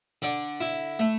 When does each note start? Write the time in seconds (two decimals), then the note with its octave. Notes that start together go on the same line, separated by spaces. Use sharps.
0.22 D3 D5
0.60 E4
0.99 A3